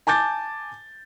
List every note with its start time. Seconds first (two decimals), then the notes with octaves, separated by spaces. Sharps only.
0.07 G#5 A5 D6 G6 A6